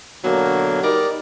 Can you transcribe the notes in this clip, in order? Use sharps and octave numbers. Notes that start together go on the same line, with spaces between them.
B2 D3 F#3 A#3
G3 D#4 A#4 D5